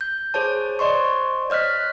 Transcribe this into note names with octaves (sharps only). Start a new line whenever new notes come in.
G6
G#4 C5 C#5 A5
C5 D5 D#5 C6 C#6
C#5 D#5 F6 F#6 B6